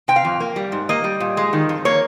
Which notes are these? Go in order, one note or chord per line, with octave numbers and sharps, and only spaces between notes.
C3 G5
F5
F2
A#3
G3
G#2
A#3 D#5
G3
A#2
G#3
D#3
F2
A#3 C#5